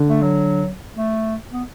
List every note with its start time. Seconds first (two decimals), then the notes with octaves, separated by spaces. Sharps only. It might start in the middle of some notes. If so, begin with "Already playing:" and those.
Already playing: D3
0.09 A3
0.22 F#3
0.95 A3
1.53 B3